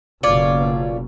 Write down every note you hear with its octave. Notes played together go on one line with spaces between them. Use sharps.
F#1 B2 F4 C#5 D5